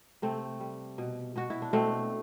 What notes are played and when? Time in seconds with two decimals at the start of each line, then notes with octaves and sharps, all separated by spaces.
0.22 C3 A3 C4
0.60 G3
0.98 B2
1.36 B2 F#4
1.50 E4
1.62 D4
1.73 B2 A3 C4